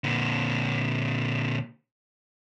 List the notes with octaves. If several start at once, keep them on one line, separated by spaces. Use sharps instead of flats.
A#2 D3